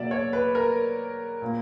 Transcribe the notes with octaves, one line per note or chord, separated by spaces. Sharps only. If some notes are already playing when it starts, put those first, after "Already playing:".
Already playing: B2 F#3 A#3 D5 E5
C#5
B4
A#4
A#2 A#3